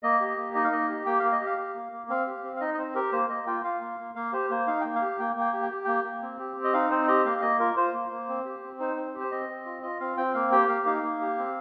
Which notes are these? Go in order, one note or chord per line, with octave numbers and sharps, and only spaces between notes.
A#3 D#5
G4
A#3
D#4 D#5
F5
A#3 D#5
G4
A#3 G5
A#3 F5
D#5
G4
F5
G4
A#3
A#3
C4 F5
G4
C4
F5
D#4 D#5
D#5
C4 C5
G4 A#4
A#3 C5
A#3 D#5
F4 G5
F4 F5
A#3
A#3
A#3 F5
G4 C5
A#3 C5
D#4 F5
A#3 G5
F5
G4
A#3 G5
A#3 G5
G4
G5
G4
A#3 G5
A#3
C4
G4
C4
D#5
D#4 F5
C4 C5
G4 D#5
A#3 F5
A#3 D#5
F4 A#4
F4 C5
A#3
A#3
C4
G4
C4
D#4 C5
C4
G4
C5
C4 D#5
C4
F4
F4 D#5
C4 F5
C4 G5
A#3 F5
G4 G5
A#3 F5
D#4 F5
A#3
G4
C4